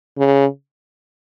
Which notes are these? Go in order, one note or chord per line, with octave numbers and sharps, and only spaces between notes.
C#3